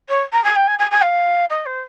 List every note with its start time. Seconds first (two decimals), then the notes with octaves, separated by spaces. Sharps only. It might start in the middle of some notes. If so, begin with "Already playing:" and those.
0.09 C#5
0.32 A#5
0.44 G#5
0.56 G5
0.67 G#5
0.79 G#5
0.91 G#5
1.03 F5
1.50 D#5
1.66 C5